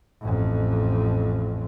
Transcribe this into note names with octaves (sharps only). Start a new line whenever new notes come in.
A1 F2